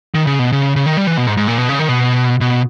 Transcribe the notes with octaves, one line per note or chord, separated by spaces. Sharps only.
D#3
C#3
B2
C#3
C#3
D#3
G3
E3
B2
G#2
G#2
A#2
B2
C#3
D#3
B2
B2